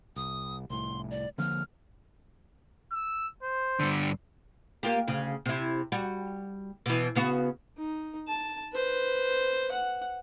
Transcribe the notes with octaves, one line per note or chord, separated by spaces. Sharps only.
C2 D#6
C2 A2 C6
D5
D3 F3 A#3 F6
E6
C5
G2 D3
A#3 F4 G4
D2 C#3
C3 E4
G3 F#4
B2 E3
C#3 B3 F#4
D#4
A5
B4 C5
F#5